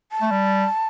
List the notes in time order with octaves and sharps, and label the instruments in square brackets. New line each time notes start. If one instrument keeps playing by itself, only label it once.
[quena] A5
[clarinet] A3
G3